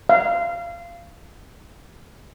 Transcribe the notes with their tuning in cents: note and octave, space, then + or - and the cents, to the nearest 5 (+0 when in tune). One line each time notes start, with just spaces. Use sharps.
F5 -20